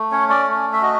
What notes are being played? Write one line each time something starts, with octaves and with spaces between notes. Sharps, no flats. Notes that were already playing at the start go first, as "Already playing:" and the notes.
Already playing: A3
C#4 C#5
D5
A3
E5
F#4 D#5